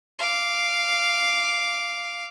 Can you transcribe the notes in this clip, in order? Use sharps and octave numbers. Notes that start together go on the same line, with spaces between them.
F5 D6